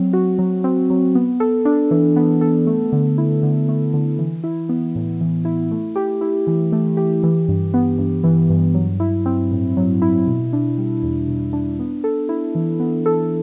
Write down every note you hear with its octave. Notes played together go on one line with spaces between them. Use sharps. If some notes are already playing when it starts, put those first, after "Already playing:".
Already playing: F#3 C4
F#4
F#3
C4
F#3
B3
A4
D4
E3
B3
A4
A3
D3
E4
D3
A3
D3
E3
E4
B3
A2
E3
E4
A3
G4
E4
E3
A3
G4
E3
G2
B3
G2
E3
G2
F#3
E4
C4
A2
F#3
E4
B2
D4
G3
E2
B2
D4
B3
A4
E4
E3
B3
A4